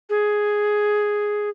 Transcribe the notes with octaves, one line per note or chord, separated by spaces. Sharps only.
G#4